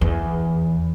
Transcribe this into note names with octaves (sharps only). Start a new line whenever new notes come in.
E2